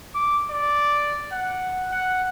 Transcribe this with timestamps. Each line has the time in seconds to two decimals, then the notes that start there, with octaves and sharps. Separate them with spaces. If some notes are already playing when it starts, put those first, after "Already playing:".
0.15 D6
0.50 D5
1.32 F#5
1.91 F#5